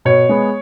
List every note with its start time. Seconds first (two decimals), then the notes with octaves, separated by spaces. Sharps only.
0.05 B2 C#5
0.29 G#3 B3